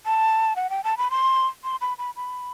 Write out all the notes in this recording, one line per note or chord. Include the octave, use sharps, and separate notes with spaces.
A5
F#5
G5
A5
B5
C6
C6
B5
B5
B5